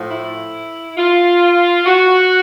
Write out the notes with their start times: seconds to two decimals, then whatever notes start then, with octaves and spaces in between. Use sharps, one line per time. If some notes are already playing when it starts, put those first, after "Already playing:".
Already playing: A2 F3
0.09 E4
0.98 F4
1.86 F#4